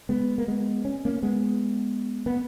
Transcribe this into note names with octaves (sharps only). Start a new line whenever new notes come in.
G#3 B3
A#3
G#3 B3
C#4
A#3 C#4
G#3 B3
B3